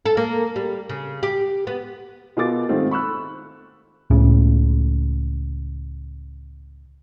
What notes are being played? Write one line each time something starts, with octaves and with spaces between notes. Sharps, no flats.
A4
A#3
G3
C#3
G4
B3
B2 F4 G#4 A#4 D6 A6
G#2 D#3 G3 A3 C4 F4
B5 C#6 E6 F#6
C#2 A2 C#3